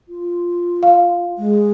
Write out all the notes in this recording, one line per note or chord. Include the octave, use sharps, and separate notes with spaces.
F4
F5
G#3